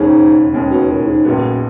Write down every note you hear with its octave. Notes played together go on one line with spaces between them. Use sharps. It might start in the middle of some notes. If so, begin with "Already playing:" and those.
Already playing: E1 D#2 G#2 C#3 G#3 C#4
E1 D#2 C#3 G#3 C#4
B2
A#2
G#2
A#1 F#2 A#2 G#3 B3
F#2